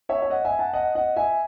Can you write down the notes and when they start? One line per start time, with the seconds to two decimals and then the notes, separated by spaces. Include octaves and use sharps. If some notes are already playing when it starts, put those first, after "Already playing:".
0.09 C#5 E5
0.22 E5
0.30 D#5 F#5
0.45 E5 G#5
0.59 F#5 A5
0.74 D#5 F#5
0.95 D#5 F#5
1.16 E5 G#5